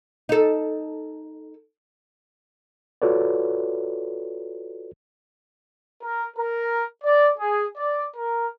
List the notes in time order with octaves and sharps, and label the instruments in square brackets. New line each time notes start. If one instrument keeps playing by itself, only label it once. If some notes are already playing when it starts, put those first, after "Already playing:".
[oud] D#4 A4
[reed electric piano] F4 F#4 A4 B4 C#5 D5
[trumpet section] A#4
A#4
D5
G#4
D5
A#4